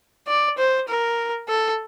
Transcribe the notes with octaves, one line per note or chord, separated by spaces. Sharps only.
D5
C5
A#4
A4